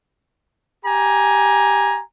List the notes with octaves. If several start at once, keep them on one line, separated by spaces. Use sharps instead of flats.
G4 G#5 A#5